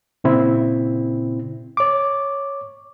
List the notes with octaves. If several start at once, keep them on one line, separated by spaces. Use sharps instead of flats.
A#2 C#3 C4 E4
C#5 D6